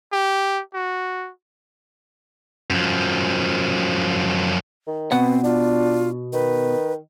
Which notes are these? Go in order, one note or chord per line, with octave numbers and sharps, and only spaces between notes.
G4
F#4
F#2 F3
D#3
B2 B3 C4 F#5
D4 F4
D#3 B4